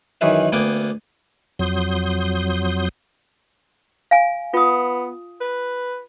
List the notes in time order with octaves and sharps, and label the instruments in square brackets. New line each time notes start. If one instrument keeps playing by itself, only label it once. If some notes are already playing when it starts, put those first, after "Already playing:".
[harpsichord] F#2 D#3 E3 G#4 B4 E5
D2 A#3 B3 G5 G#5
[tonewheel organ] F2 F#3 C6 D#6 G6
[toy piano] F5 G#5
[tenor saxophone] B3 [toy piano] F4 D#6
[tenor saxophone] B4